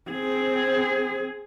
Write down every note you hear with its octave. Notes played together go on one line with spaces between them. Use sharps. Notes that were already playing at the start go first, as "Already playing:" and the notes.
C4 G#4